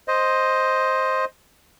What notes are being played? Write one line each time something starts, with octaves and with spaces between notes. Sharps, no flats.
C5 D#5